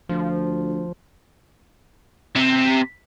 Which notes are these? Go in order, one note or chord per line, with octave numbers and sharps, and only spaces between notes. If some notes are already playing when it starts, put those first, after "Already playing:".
D2 F3
C3